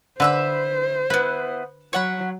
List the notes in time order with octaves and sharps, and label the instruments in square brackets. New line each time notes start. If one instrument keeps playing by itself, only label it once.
[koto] D3 [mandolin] B4 E5 B5 [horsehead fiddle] C5
[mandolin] B3 E4 [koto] B4
[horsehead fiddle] F#3 [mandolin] C#5 F#5 B5